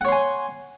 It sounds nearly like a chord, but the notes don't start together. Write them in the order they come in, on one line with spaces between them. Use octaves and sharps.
F#5 C#5 C6 G#5